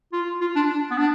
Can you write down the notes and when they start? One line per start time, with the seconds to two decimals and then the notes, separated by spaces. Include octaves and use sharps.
0.13 F4
0.41 F4
0.56 D4
0.70 D4
0.91 B3
0.98 D4